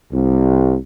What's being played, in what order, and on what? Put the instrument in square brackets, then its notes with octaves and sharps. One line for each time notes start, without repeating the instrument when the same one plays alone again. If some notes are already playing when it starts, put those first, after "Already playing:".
[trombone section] C2